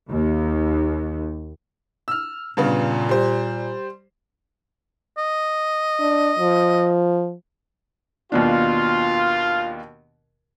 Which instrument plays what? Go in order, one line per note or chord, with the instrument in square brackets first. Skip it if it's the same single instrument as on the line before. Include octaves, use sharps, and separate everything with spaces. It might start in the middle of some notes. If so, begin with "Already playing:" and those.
[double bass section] D#2
[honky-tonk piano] E6 F6
[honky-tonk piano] G2 C#3 B3 [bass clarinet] A#2
[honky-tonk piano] G3 C5
[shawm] D#5
[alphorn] D4
F3
[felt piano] D#2 B2 D4 [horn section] F4